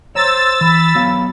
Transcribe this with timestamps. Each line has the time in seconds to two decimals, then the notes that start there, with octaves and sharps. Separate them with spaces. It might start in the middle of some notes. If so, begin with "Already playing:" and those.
0.15 C5 C#5 A#5 E6 A6
0.61 E3 B5
0.95 F#3 B3 F5